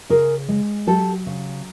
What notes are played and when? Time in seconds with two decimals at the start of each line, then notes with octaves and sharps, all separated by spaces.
0.10 C#3 G#4 A#4
0.48 G#3
0.87 F#3 G4 A4
1.26 C#3